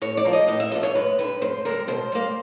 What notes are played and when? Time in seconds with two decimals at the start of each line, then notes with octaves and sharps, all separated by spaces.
0.02 A2 C#5
0.17 D5
0.25 F3 A#3
0.33 D#5
0.48 A2 D#5
0.60 E5
0.72 F3 A#3 D#5
0.83 C#5
0.95 F#2 B4
1.18 D3 G3 B4
1.41 F#2 C5
1.65 D3 G3 A#4
1.88 B2 C5
2.12 G3 A#3